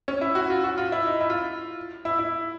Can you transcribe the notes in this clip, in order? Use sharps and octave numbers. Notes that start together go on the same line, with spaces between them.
C#4
E4
F#4
F4
F#4
F4
E4
D#4
E4
F4
E4
E4